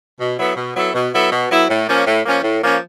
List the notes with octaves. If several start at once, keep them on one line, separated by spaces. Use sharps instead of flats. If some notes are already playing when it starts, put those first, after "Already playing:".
B2
F#3 B3 E4 A4
B2
F#3 B3 E4 A4
B2
F#3 B3 E4 A4
B2
F#3 B3 E4 A4
A2
F3 A#3 C#4
A2
F3 A#3 C#4
A2
F3 A#3 C#4